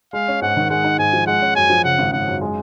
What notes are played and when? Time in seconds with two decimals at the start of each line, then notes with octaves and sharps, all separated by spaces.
0.13 G#3 F5
0.28 C#4
0.42 G#2 F#5
0.57 D#3
0.70 G#3 F#5
0.84 D#4
0.99 G#2 G#5
1.13 F3
1.27 G#3 F#5
1.42 C#4
1.56 F#2 G#5
1.70 F3
1.84 C#3 F#5
1.99 G#1
2.13 G#1 F#5
2.27 F#2
2.41 G#3